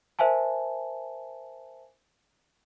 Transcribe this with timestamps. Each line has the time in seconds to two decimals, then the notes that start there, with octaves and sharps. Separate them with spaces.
0.19 A#4 C5 E5 F5 G#5 A5